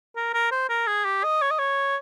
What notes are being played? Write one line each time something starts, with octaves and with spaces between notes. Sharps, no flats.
A#4
A#4
C5
A#4
G#4
G4
D#5
C#5
D#5
C#5